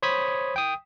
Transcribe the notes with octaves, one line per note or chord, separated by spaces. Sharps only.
C5 C#5 B5 D#6 G#6 B6
G5 D#6